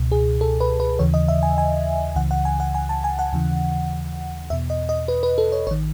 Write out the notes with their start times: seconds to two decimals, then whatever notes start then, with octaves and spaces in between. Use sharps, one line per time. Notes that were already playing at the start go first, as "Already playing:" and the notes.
Already playing: C#2 B2
0.12 G#4
0.41 A4
0.60 B4
0.80 B4
0.99 D#2 C#3 E3 C#5
1.14 D#5
1.28 E5
1.43 G#5
1.58 G#5
2.16 C#2 C#3 E3 F#5
2.31 F#5
2.45 G#5
2.60 F#5
2.75 G#5
2.89 A5
3.04 G#5
3.19 F#5
3.33 D#2 C#3 E3
4.50 E2 B2 E5
4.70 D#5
4.89 D#5
5.08 B4
5.23 B4
5.38 A4
5.52 C#5
5.67 A1 D#3 C#5